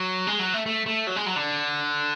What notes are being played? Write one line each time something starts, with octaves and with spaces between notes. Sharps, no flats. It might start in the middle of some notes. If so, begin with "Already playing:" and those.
Already playing: F#3
G#3
F#3
A3
A3
A3
F#3
G#3
F#3
D3